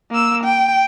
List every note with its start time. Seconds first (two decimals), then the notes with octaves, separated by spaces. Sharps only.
0.11 A#3 E6
0.44 G5